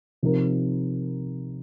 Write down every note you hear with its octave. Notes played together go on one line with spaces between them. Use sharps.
C3 F3 D#4 A#4